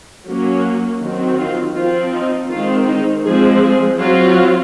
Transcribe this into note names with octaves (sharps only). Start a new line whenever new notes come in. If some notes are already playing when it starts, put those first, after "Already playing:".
F#3 A#3 C#4
D#3 F#3 C4
F4
F3 C4 F4
D#4
D#3 G#3 C4 F4
D#4
F3 G#3 C4 G#4
G#4
F#3 C4 F4